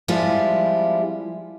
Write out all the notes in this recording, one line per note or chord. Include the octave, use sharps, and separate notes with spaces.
F3 G3 G#3 C4 E4 F4